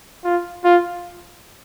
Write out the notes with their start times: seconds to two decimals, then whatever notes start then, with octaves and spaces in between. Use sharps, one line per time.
0.24 F4
0.65 F4